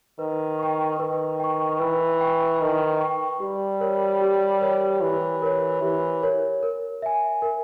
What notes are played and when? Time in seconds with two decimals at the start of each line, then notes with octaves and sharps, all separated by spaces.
0.19 D#3 B4
0.59 G5 C#6
1.00 D#3 B4
1.40 G5 C#6
1.80 E3 B4
2.21 G5 C#6
2.61 D#3 B4
3.01 G5 C#6
3.40 G3 G4
3.80 A#4 C#5
4.22 G4
4.61 A#4 C#5
5.01 E3 G4
5.42 A#4 C#5
5.82 E3 G4
6.23 A#4 C#5
6.63 A#4
7.02 E5 G#5
7.42 A#4